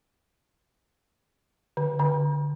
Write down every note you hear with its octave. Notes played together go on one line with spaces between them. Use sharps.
D3
D3